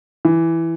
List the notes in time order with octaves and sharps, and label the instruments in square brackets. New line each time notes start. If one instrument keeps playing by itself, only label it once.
[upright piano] E3